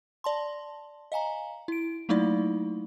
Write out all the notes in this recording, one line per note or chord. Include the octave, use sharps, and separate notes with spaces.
D5 A5 C6
D#5 F5 G#5 A#5
E4 D7
F#3 A3 A#3 D#4 E4 D5